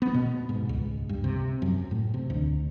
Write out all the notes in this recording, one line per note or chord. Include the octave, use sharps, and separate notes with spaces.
B3
B2
G#2
C#2
G2
C3
F#2
A2
C3
D2